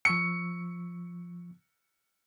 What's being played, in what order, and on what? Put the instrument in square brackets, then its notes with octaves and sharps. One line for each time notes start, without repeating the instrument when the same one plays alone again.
[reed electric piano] F3 C#6 E6 [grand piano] C#7